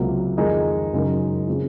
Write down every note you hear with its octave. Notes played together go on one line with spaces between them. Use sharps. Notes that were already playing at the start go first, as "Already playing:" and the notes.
Already playing: C#2 C3 F#3 A#3
F2 D#3 G#3 D#4 G#4
F#2 C#3 G#3 D#4 A#4
C#3 G#3 C4 F4